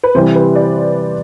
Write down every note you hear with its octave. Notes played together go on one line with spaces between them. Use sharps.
B4
C3 E3 G3 C5
B4
D5